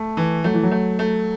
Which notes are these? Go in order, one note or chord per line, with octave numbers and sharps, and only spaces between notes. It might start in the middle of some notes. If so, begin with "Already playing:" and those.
Already playing: A3
E3
F#3 A3
E3
F#3
A3
A3